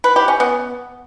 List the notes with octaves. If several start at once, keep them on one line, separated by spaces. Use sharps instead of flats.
B4
G4
C#4
B3